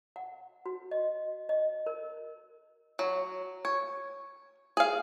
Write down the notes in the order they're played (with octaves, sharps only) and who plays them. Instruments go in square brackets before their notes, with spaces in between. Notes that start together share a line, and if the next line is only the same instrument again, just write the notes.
[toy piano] F#5
F#4
D#5
D#5
A#4
[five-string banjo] F#3
C#5
G#4 F5